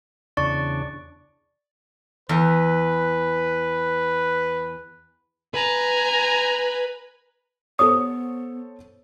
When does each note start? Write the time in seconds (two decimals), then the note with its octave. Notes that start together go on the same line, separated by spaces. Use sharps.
0.37 E2 C#3 D4 D5 C#6
2.29 E2 B4
5.54 B4 G#5 A#5
7.79 B3 A4 C5 C#5 D#6